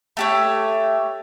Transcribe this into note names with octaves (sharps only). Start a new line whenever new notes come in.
A3 G4 C#5